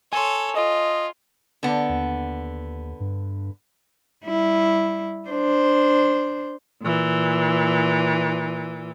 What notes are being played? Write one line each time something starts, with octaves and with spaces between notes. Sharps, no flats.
A4 C#5 G#5 C6
F4 D#5
D3 B3
D#2
G2
G3 E4
D4 C5
A#2 E3